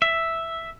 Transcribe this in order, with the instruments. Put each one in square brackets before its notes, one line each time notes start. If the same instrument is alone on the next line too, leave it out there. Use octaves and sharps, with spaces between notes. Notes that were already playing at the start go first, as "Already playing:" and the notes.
[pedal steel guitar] E5